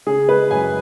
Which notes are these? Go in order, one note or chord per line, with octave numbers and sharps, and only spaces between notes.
C#3 G#4
G#3 B4
F#2 G#5